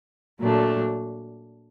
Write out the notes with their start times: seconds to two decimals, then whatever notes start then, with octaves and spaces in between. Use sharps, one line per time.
0.40 A#2 F#3 A3 D4